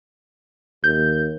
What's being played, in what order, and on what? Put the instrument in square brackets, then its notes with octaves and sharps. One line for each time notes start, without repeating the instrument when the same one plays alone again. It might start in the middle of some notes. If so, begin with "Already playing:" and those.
[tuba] D#2 [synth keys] G6